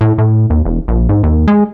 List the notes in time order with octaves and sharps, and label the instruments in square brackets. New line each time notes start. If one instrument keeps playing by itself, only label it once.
[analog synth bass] A2
A2
D#2
E1
A#1
G#2
D#2
G#3